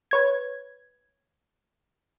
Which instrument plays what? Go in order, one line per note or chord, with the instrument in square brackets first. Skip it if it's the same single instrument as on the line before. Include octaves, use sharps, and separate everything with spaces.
[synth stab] B4 C#5 G#6